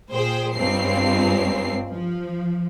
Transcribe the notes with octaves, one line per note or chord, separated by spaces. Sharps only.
A#2 G#4 C5 G5
C#2 G2 C4 C7
F3